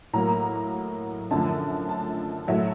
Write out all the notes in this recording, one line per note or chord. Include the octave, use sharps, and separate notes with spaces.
A2 F#3 A#3 A#5
F#2 D3 F3 A3 A5
A5
A2 F#3 A3 E5